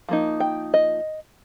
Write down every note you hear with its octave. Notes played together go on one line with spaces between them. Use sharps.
F3 A#3 D#4
G5
D#5